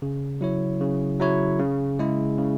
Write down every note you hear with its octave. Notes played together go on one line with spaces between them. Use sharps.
C#3
F#3 E4 C#5
C#3
F#3 E4 C#5
C#3
G#3 E4
C#3